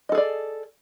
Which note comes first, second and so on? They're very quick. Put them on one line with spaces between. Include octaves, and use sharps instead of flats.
D#5 A4 G#4 D5